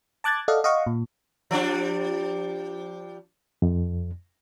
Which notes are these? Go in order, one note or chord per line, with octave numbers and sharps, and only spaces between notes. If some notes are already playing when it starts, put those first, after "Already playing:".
A5 D6 F#6 G#6 A6
A4 D5 D#5 F5 F#5
D#5 F5 F#5 C#6
A#2
F3 G3 D4
F2